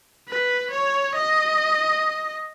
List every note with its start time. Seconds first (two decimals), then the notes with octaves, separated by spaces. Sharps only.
0.29 B4
0.71 C#5
1.15 D#5